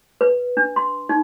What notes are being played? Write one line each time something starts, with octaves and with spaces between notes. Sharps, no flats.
B4
D4
C6
D#4